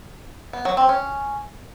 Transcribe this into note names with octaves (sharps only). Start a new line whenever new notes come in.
B3
F#3
C4
C#4